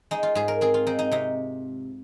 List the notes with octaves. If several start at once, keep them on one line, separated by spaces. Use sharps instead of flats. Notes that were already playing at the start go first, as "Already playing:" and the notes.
G#3 D#4
F4
G#2 G#4
A#4
C4 G#4
F4
C4 D#4
D#4
C3 D#4